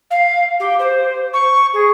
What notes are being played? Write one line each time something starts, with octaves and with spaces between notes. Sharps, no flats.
F5
G4
C5
C#6
G#4